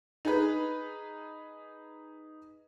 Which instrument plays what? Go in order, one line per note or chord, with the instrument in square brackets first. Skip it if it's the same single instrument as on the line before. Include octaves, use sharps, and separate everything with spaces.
[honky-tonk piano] D#4 G#4 B4